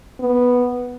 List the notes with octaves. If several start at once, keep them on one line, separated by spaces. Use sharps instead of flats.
B3